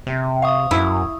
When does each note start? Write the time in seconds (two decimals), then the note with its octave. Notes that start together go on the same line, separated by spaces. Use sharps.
0.07 C3
0.42 F5 C#6 D#6
0.71 F#2 E4